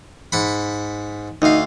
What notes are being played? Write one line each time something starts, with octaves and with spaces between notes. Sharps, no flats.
G#2 F#5 B5
D2 D#4 F5